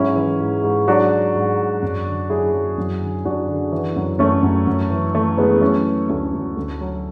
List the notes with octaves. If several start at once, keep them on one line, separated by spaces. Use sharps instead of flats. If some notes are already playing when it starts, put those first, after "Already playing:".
Already playing: G#2 F#3 C#4 E4
E3
G#2
G#2
F#3 D4 F#4
F#3
G#2
F#3
F#2
D3
F#3 E4 G#4
F#3
F#2
D3
F#2 D4 F#4
D3
E3
F#2
F#2 A3 C#4
F#2
F#2
E3
E3 A3
E3 G#3 B3
F#3 A3 C#4
F#3
D2 A3 C#4
D2
D2
F#3